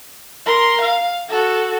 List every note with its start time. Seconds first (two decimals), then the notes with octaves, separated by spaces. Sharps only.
0.46 A#4 C6
0.81 F5
1.29 F#4 A4